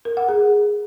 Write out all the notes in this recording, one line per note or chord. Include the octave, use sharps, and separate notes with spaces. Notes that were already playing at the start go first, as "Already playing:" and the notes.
A#4
F#5
G#4